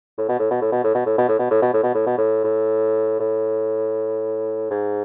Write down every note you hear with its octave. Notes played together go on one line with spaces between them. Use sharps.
A2
B2
A2
B2
A2
B2
A2
B2
A2
B2
A2
B2
A2
B2
A2
B2
A2
B2
A2
A2
A2
G#2